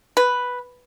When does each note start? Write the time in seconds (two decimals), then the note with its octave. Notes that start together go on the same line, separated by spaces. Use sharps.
0.17 B4